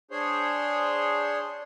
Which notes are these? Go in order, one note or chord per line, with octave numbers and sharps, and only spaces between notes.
D4 G#4 C5 C#5 C6